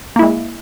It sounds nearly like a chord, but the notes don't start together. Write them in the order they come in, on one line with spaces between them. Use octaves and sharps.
A#3 E4 G#3